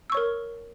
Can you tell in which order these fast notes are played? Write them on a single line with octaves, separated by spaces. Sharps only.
E6 C#6 C#5 A#4